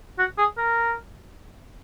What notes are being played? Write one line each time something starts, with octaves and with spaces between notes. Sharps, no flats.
F#4
G#4
A#4